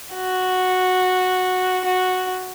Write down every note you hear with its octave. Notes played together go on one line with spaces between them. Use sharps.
F#4
F#4